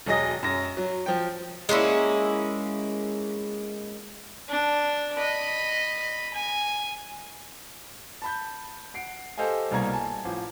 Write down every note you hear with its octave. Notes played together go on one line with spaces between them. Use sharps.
E1 F#3 G#4 D#5 A#6
F#2 A#6
F#3
F3 G5
G#3 A#3 C#4 E4
D4
D#5 B5
G#5
A5 B5 G6
F#5 C7 D7
G4 A4 C5 D#5 F5 G#5
C2 B2 G3 A#3 A#5 G#6
G#5 A5
A1 F3